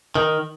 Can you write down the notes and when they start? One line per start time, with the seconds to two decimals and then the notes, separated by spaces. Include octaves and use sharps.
0.15 D#3